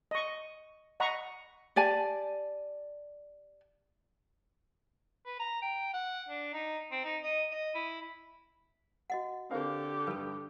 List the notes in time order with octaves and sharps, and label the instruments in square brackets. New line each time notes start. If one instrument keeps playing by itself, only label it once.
[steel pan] D#5 C#6
D#5 F#5 A#5 B5 C#6
[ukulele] G4 D5 G#5 A5
[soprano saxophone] B4
A#5
G5
F#5
D4
D#4
C4
D#4
D#5
D#5
E4
[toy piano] F#4 D#5 F#5
[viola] D3 G4 [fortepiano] C4 A#4 F5
[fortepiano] G2 [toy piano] A4 B4